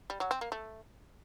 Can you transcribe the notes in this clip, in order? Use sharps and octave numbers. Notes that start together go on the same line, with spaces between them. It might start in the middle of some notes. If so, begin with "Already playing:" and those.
G3
F#3
C4
A#3
A3